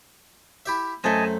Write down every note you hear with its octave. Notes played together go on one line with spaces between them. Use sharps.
E4 G4 E5
F#2 A3 C4 D#5 G#5 A5